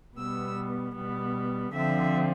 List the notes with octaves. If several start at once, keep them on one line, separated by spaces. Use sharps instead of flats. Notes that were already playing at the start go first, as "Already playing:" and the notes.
B2 G3 B3 E6
B2 G3 B3
D3 F3 C4 E5